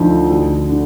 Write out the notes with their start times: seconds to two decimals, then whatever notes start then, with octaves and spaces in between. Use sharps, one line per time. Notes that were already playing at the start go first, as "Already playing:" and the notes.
Already playing: D2 D3 F3 D#4
0.30 D2
0.69 D3